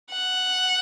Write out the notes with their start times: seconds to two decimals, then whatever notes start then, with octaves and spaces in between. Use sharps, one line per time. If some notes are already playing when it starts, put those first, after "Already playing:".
0.11 F#5